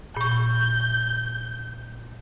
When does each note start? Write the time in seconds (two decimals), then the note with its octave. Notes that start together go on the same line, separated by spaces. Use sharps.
0.17 A#2 C#6 G6